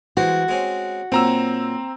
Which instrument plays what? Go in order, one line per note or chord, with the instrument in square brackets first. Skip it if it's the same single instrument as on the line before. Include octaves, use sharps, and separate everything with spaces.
[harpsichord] E3 G#3 C5 [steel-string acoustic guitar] F#4
[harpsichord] G#3 C4 C#4
[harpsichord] A#2 F#3 [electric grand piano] C4 A#5 E6